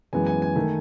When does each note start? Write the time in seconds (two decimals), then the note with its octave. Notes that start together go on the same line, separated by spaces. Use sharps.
0.13 F#2 E3 G#3 B3 G#5
0.26 G#5
0.42 G#5
0.56 D#3 A3